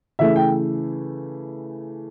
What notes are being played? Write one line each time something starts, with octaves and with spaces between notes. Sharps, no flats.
C#3 E3 A3 E5
G5